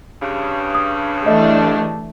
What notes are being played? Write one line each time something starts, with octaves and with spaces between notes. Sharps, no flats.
G2 C#3
D#6
E3 A3 D4 D#5 E5